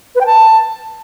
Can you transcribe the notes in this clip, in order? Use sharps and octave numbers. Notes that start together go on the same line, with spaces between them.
B4
G5
A5